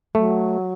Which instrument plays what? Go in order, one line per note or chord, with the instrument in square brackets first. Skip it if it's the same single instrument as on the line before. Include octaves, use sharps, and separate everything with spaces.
[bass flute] F#3 [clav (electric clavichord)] A3